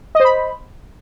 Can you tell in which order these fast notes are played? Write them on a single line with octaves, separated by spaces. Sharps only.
D#5 C5 B5